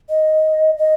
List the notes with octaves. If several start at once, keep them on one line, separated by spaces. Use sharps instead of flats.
D#5
D#5